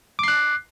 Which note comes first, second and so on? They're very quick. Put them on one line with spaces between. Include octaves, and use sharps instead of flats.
D6 C7 F#6